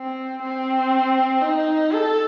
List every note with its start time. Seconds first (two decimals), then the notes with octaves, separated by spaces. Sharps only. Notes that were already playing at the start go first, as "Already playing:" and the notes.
Already playing: C4
0.42 C4
1.42 D#4
1.91 A4